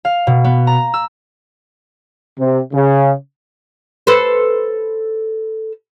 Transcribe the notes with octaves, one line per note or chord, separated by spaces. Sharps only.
F5
B2
B3
A#5
E6
C3
C#3
A4 B4 C5